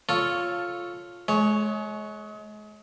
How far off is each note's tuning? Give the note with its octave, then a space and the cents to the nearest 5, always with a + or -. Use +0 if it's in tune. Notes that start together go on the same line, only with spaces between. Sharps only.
F4 +5 A4 +0 C#5 +0
G#3 +35 C#5 +0